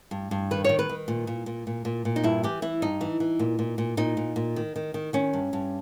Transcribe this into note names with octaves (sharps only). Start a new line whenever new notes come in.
G2
G2
D#3 B4
D#3 C#5
B4
D#3
A#2
A#2
A#2
A#2
A#2
A#2
D#4
G2 E4
E3 G4
E3 E4
G2 D#4
E3
E3
A#2
A#2
A#2
A#2 D#4
A#2
A#2
D#3
D#3
D#3
D#3 C#4
G2
G2